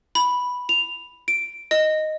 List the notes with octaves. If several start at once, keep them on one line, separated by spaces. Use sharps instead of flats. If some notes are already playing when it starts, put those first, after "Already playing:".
B5
F7
D7
D#5